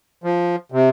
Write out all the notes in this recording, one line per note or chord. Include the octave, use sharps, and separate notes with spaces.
F3
C3